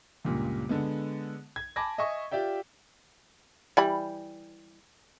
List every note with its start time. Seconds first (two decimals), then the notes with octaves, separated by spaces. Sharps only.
0.25 C#2 G2 A#2
0.69 D3 G#3 B3
1.56 G#6
1.76 G#5 A5 B5 D6 G#6 A#6
1.98 D#5 E5 G#5 C#6 D#6
2.31 F4 G4 D5 E5 G5
3.77 E3 G3 B5